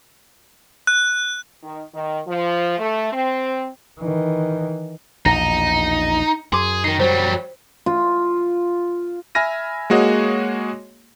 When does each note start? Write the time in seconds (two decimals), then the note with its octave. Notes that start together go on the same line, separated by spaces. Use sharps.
0.87 F#6
1.63 D#3
1.94 D#3
2.27 F3
2.79 A3
3.12 C4
4.00 D#3 E3
5.25 A#1 E2 B2 D#4 A#5 A#6
6.53 F#2 G#4 C6 D6
6.84 D#3 D#4 C7
7.00 F#3 G3 C5
7.86 F4
9.35 E5 G#5 B5 F6 A#6 D#7
9.90 G#3 A#3 F#4 G#4 C#5 D#5